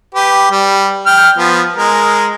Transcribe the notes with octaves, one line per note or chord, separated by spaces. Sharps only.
G4 B4
G3
G5 F6
F3 B3
G#3 A#4